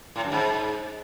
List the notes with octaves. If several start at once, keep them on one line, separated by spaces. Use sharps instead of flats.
A2
F#2
G#2